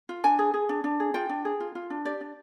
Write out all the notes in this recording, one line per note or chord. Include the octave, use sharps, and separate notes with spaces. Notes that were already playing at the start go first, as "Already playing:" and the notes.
F4
D4 G#5
G#4
G#4
D4
D4
G#4
F4 G5
D4
G#4
F4
F4
D4
G4 D5
D4